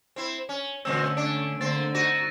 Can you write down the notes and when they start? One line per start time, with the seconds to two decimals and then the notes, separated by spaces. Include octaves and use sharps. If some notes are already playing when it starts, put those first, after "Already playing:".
0.16 C4 E4
0.49 C#4
0.85 A#2 D3 A3 C4 C#4 E6
1.17 D4 D7
1.61 D3 A3 A#3 C4 A6
1.95 D#4 F#4 A#6 D#7